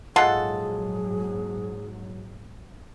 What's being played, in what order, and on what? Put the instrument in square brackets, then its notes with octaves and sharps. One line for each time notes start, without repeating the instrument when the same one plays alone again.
[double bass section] A#1 G#2 F#3 [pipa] G#3 F4 A4 [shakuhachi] G#4 [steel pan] F#5